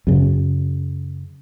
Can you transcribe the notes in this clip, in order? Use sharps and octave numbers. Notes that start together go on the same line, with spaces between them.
F#2 C#3